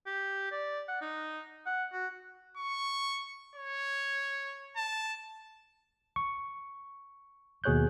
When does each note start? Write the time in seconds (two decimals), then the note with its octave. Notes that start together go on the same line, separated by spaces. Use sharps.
0.07 G4
0.51 D5
0.88 F#5
1.01 D#4
1.66 F#5
1.93 F#4
2.57 C#6
3.55 C#5
4.76 A5
6.16 C#6
7.64 D#2 B2 G#4 C#5 F#6 G6